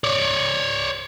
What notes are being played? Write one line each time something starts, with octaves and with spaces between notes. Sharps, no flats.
C#5 D5